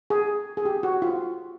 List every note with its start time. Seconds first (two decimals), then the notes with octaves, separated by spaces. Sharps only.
0.10 G#4
0.57 G#4
0.65 G4
0.83 F#4
1.02 F4